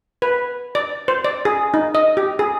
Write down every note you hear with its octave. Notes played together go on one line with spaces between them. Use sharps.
B4
D5
C5
D5
G#4
D#4
D#5
G4
G#4